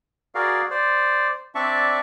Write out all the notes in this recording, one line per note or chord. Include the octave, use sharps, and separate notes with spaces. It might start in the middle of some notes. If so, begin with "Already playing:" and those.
F#4 G#4 A#4 D5 F5
C5 D5
C4 D4 D5 E5 A5 C#6